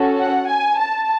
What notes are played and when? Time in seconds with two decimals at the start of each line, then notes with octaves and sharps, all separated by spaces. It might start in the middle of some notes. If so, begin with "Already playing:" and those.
Already playing: C#4 F#4 A4
0.19 F#5
0.49 G#5
0.79 A5